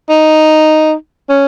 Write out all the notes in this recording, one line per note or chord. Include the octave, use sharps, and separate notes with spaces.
D#4
C#4